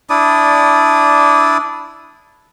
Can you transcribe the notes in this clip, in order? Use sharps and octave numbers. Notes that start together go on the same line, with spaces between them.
D4 E4 D5 D#6